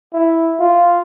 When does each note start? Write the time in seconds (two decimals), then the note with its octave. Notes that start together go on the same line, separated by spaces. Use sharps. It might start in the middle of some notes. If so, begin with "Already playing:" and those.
0.13 E4
0.59 F4